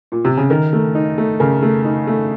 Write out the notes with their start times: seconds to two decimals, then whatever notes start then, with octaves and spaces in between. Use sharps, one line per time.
0.12 A#2
0.25 C3
0.37 C#3
0.50 D#3 A#4
0.73 A3
0.95 D#4
1.18 A3
1.40 C#3 A#4
1.62 A3
1.85 D#4
2.07 A3